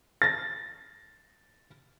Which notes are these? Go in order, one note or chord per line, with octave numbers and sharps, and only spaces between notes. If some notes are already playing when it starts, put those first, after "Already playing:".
A6 A#6